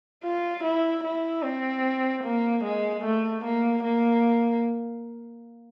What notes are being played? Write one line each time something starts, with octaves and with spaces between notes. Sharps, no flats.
F4
E4
E4
C4
A#3
G#3
A3
A#3
A#3